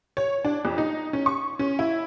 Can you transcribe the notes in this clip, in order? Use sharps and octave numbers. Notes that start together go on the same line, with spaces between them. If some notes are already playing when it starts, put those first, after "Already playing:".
C#5
D4
F2
D#4
C#4
C#6
C#4
E4